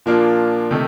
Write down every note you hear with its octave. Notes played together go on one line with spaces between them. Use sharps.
A#2 F3 A#3 D4 F4
C3 D#3 A3